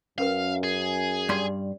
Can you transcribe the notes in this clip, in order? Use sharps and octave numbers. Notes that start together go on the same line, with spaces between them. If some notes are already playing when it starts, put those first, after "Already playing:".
F#2 C#4 A#4 B4 F5
G#4
G2 D5 C6